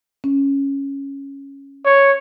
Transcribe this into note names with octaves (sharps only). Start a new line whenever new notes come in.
C#4
C#5